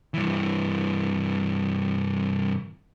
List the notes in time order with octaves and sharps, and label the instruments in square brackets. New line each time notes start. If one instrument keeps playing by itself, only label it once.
[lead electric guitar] G2 E3